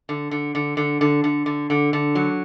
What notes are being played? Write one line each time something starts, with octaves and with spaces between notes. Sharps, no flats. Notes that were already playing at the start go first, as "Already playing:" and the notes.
D3
D3
D3
D3
D3
D3
D3
D3
D3
F#3